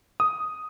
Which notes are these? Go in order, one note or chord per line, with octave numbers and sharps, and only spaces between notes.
D#6